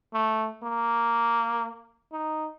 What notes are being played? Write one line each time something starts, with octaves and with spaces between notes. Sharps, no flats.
A3
A#3
D#4